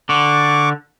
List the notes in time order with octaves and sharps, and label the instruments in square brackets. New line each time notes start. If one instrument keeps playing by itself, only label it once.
[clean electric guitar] D3 [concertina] C#6 D6